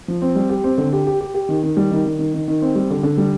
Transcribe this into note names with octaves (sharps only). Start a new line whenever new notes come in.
F3
C4
G3
G4
C4
D3
G4
G4
G4
G4
D#3
D#3
G3
D#3
D#3
D#3
D#3
D#3
C4
G3
D3
D3
G3